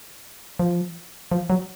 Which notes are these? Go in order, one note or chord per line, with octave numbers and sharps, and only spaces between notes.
F3
F3
F#3